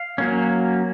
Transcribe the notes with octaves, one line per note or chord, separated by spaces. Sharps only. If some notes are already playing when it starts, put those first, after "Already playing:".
Already playing: F5
F#3 A#3 C#4